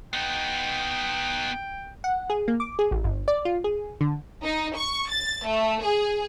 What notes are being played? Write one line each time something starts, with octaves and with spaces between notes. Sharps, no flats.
B3 D#4 G5
F#5
G#4
A#3
D6
G#4
A1
G1
D5
F4
G#4
D3
D#4
C#6
A6
A3
G#4